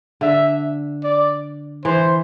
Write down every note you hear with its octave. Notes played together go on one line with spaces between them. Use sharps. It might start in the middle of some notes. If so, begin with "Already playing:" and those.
D3 E5
D5
E3 C5